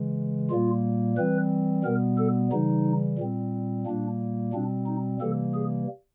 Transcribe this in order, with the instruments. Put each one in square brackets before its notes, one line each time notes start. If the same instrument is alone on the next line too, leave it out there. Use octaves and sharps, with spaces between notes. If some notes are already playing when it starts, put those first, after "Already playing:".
Already playing: [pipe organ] C#3 E3 G#3
A#2 G3 A#3 F4
E3 G3 C4 B4
B2 G3 B3 A#4
A4
C#3 E3 G3 D#4
A#2 G3 C4
A#2 G3 A#3 D4
B2 G3 C4 D4
D#4
C3 E3 G3 A#3 A4
G#4